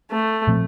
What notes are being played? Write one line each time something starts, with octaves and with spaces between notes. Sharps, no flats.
A3
A#2 F3 A3 C4